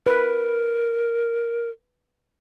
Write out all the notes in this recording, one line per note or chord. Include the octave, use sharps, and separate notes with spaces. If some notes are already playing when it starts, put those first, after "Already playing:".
A#4 B4